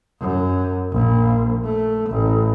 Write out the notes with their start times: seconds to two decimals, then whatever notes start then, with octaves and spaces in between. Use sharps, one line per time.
0.21 F#2
0.92 A#1
1.65 A3
2.10 A1